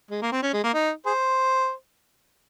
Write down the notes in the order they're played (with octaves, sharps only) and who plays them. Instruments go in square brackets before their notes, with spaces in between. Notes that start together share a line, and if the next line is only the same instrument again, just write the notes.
[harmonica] G#3
A#3
C4
C#4
G#3
A#3
D#4
G#4 C5